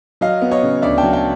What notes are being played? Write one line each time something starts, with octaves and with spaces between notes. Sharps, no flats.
F#3 D#5 F5
B3
C#5 D#5
C#3
D2 D5 E5
G5 A5
F#3
G5 A5